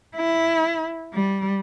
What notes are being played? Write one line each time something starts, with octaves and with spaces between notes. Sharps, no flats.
E4
G3